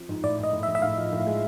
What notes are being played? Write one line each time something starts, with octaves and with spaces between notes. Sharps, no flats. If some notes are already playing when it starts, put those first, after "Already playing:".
Already playing: F3 C4
G#2
A2 D5
A2 D#5
A2
E5
A2
E5
A2 F5
F3
A2
G#3